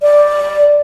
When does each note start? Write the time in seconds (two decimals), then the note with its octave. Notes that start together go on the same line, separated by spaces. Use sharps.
0.03 D5